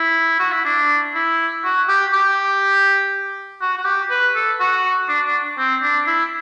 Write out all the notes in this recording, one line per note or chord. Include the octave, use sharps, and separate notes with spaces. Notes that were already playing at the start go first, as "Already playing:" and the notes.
Already playing: E4
F#4
E4
D4
E4
F#4
G4
G4
F#4
F#4
G4
B4
A4
F#4
D4
D4
C4
D4
E4